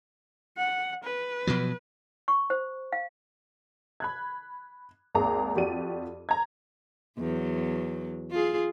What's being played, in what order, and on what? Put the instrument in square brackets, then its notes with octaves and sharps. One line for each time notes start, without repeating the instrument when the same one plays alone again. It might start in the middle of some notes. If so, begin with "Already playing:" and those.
[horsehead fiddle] F#5
B4
[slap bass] B2 F3 F#3
[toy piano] C#6
C5
F5
[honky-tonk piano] B5 F#6 G#6
G#1 D#2 G#4 A#5 D6
F2 F#4 G4 D5 D#7
A#5 G#6
[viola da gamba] E2 F#3
F4 G#4